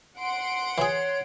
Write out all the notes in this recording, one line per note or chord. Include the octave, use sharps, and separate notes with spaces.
F#5 C6 D7
E3 G#4 C#5